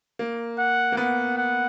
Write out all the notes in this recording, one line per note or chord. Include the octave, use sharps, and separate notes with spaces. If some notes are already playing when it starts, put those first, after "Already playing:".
A#3
F#5
A#3
B3 F#5
F#5